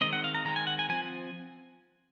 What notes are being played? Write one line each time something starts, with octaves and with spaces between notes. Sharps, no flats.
D#3 G#3 C4 D#5
F#5
F5
A#5
D#3 G#3 C4 A#5
G#5
F#5
G#5
F3 C4 G#5